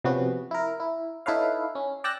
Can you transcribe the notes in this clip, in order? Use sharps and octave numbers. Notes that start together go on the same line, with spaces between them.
C3 F3 B3 C#4 F#4
E4 A#4
E4
D#4 E4 A4 B4 C#5 F5
C#4
D5 G5 D6 E6 F#6 A#6